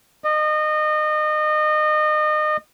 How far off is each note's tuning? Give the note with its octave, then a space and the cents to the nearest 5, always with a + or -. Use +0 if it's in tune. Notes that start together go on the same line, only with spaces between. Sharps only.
D#5 -30